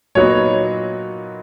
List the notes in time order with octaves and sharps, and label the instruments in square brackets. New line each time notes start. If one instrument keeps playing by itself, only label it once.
[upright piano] A#2 F#3 B3 D#4 F#4 [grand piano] C#5